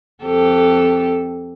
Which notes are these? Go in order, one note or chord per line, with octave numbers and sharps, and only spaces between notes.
F2 G4 A4